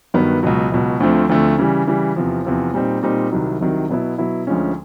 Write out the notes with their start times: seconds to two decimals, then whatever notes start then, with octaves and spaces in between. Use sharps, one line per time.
0.14 G2 D#3 F#3 B3
0.43 C#2 B2 F#3
0.72 C#2 B2 F#3
1.00 D2 D3 F3 A3 C4
1.29 D2 D3 F3 A3 C4
1.58 C#3 E3 G3
1.87 C#3 E3 G3
2.16 E2 C3 F3
2.45 E2 C3 F3
2.74 A#2 G3 C4 D#4
3.03 A#2 G3 C4 D#4
3.32 C2 C3 D#3 F#3
3.60 C2 C3 D#3 F#3
3.89 B2 F#3 B3 E4
4.18 B2 F#3 B3 E4
4.47 D2 D3 F3 G#3 C#4